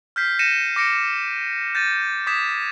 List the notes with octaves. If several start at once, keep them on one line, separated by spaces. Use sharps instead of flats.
F6 G6 B6 C7
A#6 C#7 D#7 E7
D6 A#6 C#7 D7
G6 A6 A#6 D#7
D6 D#6 G#6 B6 E7